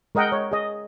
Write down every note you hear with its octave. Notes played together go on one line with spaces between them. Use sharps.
G#3 A#4 D#5 F#5 G5
C#5
G#4 D#5